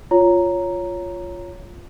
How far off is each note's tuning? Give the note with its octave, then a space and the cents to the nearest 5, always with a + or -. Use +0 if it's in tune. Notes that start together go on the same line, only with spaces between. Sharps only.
F4 +0 C#5 +5 A#5 +0